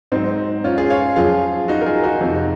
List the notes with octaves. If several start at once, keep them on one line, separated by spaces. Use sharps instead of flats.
G#2 F#3 C4 D#4
C#4 F4
F4 G#4
C#5 F5
F#2 F3 F4 G#4
D#4 F#4
A#4
F4 G#4
D#4 F#4
F2 C3 F3